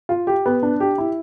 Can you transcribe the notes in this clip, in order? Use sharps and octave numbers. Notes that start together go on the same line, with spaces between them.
F4
G4
B3
D4
G4
E4